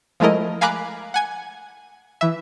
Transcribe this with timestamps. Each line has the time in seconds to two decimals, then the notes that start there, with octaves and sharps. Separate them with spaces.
0.20 F3 G#3 A3 E4 A#4 D#5
0.61 F5 G#5 A#5 B5 D6 F#6
1.14 F#5 G#5 G#6
2.21 E3 E5